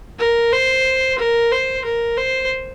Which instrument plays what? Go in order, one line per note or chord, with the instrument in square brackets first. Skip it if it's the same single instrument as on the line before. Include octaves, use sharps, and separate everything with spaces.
[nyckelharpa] A#4
C5
A#4
C5
A#4
C5